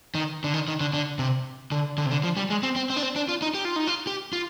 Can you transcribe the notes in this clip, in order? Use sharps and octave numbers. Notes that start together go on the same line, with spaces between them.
D#3
D3
D#3
D#3
D3
D3
C3
D3
D3
C3
D3
F3
G3
G#3
C4
C4
C4
D4
C4
D4
F4
D#4
G4
F4
D#4
F4
G4
F4